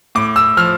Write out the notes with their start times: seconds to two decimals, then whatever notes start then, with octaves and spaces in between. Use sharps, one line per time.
0.15 A2 D6
0.36 E6
0.57 F3 F6